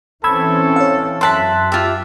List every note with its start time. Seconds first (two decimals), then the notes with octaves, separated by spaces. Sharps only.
0.24 E3 C4 C#4 A4 B5 E6 G#6
0.76 C#5 F5
1.21 F#2 E5 A5 C6 F#6 B6
1.72 F4 G4 E5